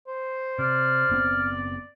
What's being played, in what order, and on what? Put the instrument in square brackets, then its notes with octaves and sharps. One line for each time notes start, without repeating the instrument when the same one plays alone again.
[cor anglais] C5
[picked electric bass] C3 [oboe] D5 [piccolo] F6
[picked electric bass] F#1 B3 C4